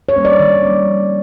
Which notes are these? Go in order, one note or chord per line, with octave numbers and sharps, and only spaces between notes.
C#5
G3 A#3 C#4
D5
D#3
G3 A#3 C#4
F3